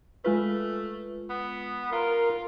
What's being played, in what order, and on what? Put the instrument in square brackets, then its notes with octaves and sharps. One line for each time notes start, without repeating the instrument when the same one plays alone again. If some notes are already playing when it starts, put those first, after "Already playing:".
[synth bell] G#3 F4 B4 [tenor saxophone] A3
[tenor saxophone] B3
[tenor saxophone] F4 [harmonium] A#4